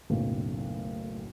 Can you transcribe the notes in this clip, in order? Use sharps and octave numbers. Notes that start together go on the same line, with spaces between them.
F#1 B1 A2